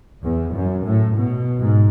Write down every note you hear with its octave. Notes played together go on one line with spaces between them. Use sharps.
E2
F#2
A2
B2
G#2